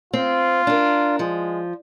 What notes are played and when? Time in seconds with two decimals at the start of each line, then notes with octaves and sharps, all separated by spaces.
0.13 C4 F4
0.67 D4 A#4
1.19 F3 G#3